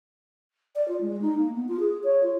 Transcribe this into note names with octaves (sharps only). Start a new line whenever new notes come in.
D5
F4
G#3
D#4
A#3
B3
F4
G#4
C#5
F4